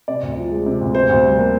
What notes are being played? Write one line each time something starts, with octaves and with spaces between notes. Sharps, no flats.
C3 D5
D2
F3
G#3
C3
D2
C3 C5
D2
G3
A#3